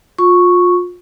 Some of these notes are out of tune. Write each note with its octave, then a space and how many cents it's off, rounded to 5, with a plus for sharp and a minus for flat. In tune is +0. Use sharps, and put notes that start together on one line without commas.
F4 +30 C#6 +0